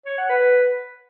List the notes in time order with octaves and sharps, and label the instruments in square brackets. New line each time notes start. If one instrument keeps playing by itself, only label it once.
[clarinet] C#5
F#5
B4